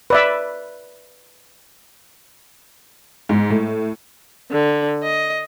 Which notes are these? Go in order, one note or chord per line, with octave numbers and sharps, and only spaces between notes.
B4 D5 E5
G#2
A2
D3
D#5